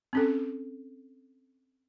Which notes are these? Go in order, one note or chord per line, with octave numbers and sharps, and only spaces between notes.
C4 C#4 A4